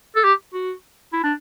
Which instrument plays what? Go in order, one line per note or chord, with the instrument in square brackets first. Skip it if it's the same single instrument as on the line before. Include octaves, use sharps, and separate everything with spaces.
[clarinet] A4
G4
F#4
E4
D4